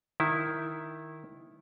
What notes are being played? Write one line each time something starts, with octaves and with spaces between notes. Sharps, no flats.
D#3 E4